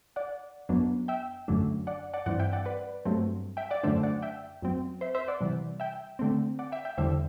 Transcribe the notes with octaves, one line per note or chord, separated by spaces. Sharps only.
D5 F#5
F#2 F#3 B3 D4
E5 G5
F#2 D3 F#3 A3 D4
D5 F#5
D5 F#5
G2 E3 G3 C4 D5 F#5
E5 G5
D5 F#5
B4 D5
G2 F#3 A3 C4
E5 G5
D5 F#5
F#2 D3 A3 D4 C5 E5
D5 F#5
E5 G5
F#2 F#3 C4
C5 E5
C5 E5
D5 F#5
C3 E3 G3
E5 G5
D3 A3 C4
D5 F#5
E5 G5
E5 G5
E2 D3 G3 C5 E5